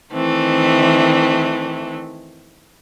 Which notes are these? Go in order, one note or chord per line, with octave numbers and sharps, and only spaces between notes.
D#3 E3 A3 C4